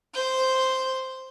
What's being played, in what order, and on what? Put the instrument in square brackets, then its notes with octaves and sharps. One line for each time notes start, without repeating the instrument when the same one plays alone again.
[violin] C5 G6